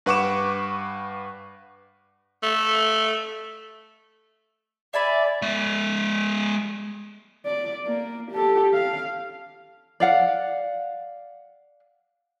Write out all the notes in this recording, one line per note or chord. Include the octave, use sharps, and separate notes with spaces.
G2 B4 F#5 C#6 D6 E7
A3
D5 E5 G#5 B5
G#3 E5
D5
A#3
G4 A4
F5
D5 F5 F#5